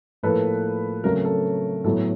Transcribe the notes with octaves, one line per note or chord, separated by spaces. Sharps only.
A2 F3 A#3 A4 B4
C#3 F#3 A3 C4 A#4
A4
A2 F#3 B3 A4